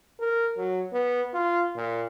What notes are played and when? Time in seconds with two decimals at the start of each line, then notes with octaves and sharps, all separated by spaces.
0.20 A#4
0.57 F#3
0.93 B3
1.34 F4
1.76 A#2